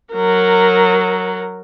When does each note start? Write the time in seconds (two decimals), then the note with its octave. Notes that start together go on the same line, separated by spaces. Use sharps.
0.13 F#3 A#4